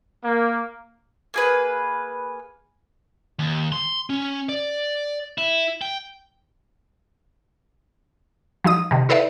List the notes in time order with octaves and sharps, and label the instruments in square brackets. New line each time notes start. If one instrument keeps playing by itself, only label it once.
[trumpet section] A#3
[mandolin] A#3 G#4 B4
[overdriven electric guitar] D#2
C6
C#4
D5
E4
G5
[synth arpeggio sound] F3 F#3 D#4 D#6
C3 D#3
E4 A4 B4 C5 D5 E5